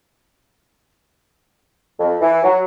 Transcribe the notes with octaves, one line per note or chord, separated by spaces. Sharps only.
F2
E3
F#3